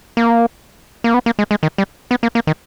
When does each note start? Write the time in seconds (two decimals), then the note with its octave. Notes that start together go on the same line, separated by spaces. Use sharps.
0.17 A#3
1.04 A#3
1.14 B3
1.26 A#3
1.39 G#3
1.51 G#3
1.63 D#3
1.78 G3
2.11 B3
2.23 A#3
2.35 A#3
2.47 D#3